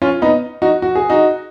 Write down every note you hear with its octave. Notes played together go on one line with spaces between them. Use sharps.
C#4 F4
B3 D#4
D#4 F#4
F#4
G#4
D#4 F#4